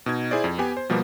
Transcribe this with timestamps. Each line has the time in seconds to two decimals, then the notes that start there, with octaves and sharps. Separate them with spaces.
0.06 B2 D#4 G#6
0.31 E4 G#4 C5 D5
0.44 F2
0.58 B3 G4 G#5
0.77 C5
0.90 B2 F3 G3 A#3 B3 G4